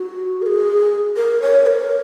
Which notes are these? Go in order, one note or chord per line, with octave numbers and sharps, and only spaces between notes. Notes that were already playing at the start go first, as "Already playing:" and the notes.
Already playing: F#4
A#4
G#4
A#4
C#5
A#4